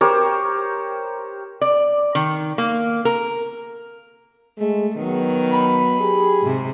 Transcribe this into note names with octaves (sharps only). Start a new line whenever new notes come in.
G4 A#4 C5 C#5
D5
D#3
A#3
A#4
G#3 A3
D#3 F#3 B3 D#4
B5
G4 G#4
G#2 C3